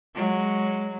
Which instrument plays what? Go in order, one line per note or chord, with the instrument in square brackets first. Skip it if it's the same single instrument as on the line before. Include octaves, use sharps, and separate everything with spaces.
[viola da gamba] F#3 G#3